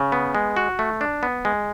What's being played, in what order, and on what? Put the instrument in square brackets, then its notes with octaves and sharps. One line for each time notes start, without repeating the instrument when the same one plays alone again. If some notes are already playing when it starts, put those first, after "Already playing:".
Already playing: [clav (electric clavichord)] C#3
B3
G#3
F#4
A3
D4
B3
G#3